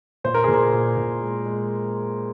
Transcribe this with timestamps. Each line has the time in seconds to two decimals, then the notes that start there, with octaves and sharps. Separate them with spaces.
0.24 A#2 C5
0.34 A#4
0.44 A#2 G#4
0.54 A#4
0.73 A#2
0.97 A#2
1.21 G#3
1.46 G#3